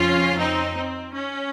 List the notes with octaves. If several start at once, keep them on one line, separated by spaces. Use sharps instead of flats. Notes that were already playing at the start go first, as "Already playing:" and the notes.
Already playing: F2 C#3 F3 C#4 F4
C4 D#4
C4
C#4